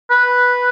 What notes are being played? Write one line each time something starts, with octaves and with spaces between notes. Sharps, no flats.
B4